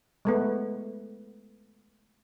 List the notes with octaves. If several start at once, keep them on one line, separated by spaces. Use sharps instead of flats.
G#3 A3 B3